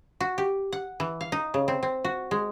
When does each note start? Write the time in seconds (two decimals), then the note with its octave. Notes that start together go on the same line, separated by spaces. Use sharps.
0.21 F#4
0.38 G4
0.72 F#5
1.00 E3
1.21 F5
1.32 D#4
1.54 C#3
1.68 C4
1.83 C4
2.05 F#4
2.31 G#3